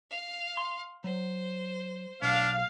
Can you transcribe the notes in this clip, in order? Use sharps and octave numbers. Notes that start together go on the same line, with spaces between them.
F5
C6
F#3 C5
B1 D4 F5